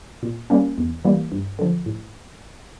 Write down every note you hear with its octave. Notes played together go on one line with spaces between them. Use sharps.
A#2
G3 A#3 C#4
E2
E3 G3 A#3
G2
D3 F3
A2